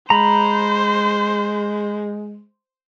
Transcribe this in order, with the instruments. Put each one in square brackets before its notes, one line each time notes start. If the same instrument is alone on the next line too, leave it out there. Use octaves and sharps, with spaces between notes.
[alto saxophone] G#3 [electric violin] C5 [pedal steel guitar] A#5 B5